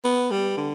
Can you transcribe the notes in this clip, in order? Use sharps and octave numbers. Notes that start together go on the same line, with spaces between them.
B3
G3
D3